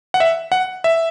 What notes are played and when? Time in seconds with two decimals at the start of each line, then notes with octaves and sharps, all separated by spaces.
0.14 F#5
0.20 E5
0.52 F#5
0.84 E5